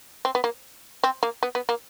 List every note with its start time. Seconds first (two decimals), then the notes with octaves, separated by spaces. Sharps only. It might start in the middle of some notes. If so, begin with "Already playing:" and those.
0.25 C4
0.35 B3
0.44 A#3
1.04 C4
1.23 A#3
1.43 B3
1.55 B3
1.69 A#3